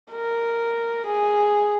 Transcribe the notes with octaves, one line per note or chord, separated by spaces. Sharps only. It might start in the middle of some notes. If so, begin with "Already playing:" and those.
A#4
G#4